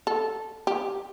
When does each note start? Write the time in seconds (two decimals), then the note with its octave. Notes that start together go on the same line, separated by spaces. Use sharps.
0.07 A4
0.67 G4